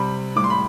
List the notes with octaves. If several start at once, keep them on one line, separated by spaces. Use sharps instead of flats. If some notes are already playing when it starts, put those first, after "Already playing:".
Already playing: C3 G3 B5
A2 G3 D6
C6
B5